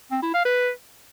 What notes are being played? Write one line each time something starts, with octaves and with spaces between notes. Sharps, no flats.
C4
E4
F5
B4